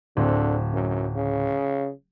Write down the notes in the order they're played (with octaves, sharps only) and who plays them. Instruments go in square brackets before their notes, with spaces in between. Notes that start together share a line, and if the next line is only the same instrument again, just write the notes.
[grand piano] D1 C4 [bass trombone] D3
[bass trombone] F#2
C#3